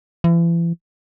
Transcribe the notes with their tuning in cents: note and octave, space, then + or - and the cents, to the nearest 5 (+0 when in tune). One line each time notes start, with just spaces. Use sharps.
E3 +40